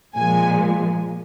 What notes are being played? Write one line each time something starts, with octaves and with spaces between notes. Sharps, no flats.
A#2 F3 G#3 G#5